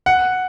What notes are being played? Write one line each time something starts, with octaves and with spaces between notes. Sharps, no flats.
F#5